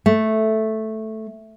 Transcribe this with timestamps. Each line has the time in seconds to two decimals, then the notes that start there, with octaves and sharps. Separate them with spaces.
0.06 A3